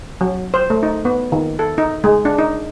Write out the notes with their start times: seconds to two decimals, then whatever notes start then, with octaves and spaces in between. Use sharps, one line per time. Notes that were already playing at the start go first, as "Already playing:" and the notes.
0.21 F#3
0.54 C5
0.70 A3
0.83 D#4
1.05 B3
1.32 D#3
1.59 A4
1.78 D#4
2.04 G#3
2.25 D4
2.39 D#4